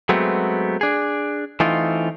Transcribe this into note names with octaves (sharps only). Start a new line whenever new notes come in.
F#3 G#3 A3 B3 C4
D4 G#4
E3 A3 C4 D#4 F4